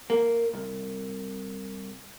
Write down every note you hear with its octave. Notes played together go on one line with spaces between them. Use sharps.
A#3
C2